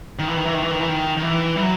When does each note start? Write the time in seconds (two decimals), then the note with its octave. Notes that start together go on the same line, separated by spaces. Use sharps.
0.19 D#3
0.28 E3
0.37 D#3
0.45 E3
0.54 D#3
0.62 E3
0.71 D#3
0.80 E3
0.89 D#3
1.17 D#3
1.22 E3
1.56 G3
1.61 F#3